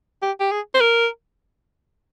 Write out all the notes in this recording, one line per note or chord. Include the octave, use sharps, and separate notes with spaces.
G4
G4
G#4
C5
A#4